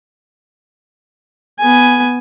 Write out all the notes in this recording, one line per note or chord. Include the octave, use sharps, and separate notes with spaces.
B3 G#5